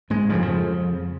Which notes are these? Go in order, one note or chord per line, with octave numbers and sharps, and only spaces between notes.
G#2 G#3
F2 C#3 F3
F3